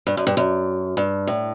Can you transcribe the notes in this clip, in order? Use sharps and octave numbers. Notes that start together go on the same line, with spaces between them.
G2
F#2
G2
F#2
G2
A2